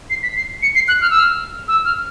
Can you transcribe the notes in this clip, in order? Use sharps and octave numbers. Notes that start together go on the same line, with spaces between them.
C7
B6
C7
C#7
C7
F#6
F6
E6
F6
E6
F6